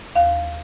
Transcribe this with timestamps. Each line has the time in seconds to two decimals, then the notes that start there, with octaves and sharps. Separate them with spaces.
0.15 D#2 F5